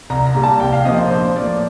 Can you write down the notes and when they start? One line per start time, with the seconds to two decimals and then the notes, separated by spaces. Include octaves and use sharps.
0.10 C2 A#5
0.26 A#5
0.35 A#2 G3
0.44 A5
0.60 C2 G5
0.73 F5
0.85 C3 F3 A#3 D#5
0.98 C5
1.10 A#1 C5
1.36 A2 F3 A#3 D5